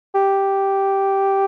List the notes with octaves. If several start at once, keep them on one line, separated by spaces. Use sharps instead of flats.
G4